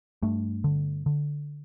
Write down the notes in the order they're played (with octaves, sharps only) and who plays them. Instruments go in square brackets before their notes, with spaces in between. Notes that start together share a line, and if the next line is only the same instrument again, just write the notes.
[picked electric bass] G2 A3
D3
D3